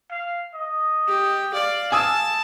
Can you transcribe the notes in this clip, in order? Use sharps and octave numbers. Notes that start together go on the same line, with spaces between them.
F5
D#5
G4
D5 F5
G#5 A5 D#6 E6